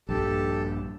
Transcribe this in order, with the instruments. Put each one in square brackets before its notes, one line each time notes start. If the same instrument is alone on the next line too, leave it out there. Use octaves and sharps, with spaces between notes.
[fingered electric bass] A#1 G2 [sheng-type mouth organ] G4 A4 A5